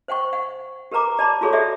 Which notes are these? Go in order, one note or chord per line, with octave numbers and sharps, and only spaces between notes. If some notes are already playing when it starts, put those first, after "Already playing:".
C5 F#5 G5 C#6
F#5
G4 A#4 B4 A#5 D6
D5 A5 B5 D6
F4 F#4 G#4 A4 C#5
G4 G#4 C#5 D5 E5 F#5